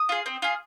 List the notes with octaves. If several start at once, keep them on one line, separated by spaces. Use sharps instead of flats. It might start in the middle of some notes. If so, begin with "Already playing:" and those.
Already playing: D#6
F4 G#4
C4
F4 G#4